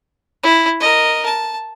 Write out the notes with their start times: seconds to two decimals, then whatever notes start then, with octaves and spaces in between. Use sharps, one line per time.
0.43 E4
0.80 A#4 D#5
1.25 A5